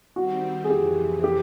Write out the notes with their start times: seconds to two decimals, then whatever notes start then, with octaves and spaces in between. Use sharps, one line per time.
0.16 D#3 G3 C4 F#4
0.64 G#4
0.69 F2 C3 E3 G4
1.24 G4